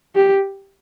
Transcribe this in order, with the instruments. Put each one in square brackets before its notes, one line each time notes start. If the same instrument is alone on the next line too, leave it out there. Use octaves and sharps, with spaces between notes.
[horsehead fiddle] G4